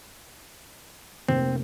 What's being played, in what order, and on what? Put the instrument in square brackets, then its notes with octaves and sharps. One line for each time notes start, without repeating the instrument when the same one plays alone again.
[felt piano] F1 C3 A#3 [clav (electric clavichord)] C4